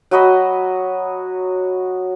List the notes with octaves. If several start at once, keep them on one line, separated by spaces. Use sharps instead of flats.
F#3 F#4 D#5 B5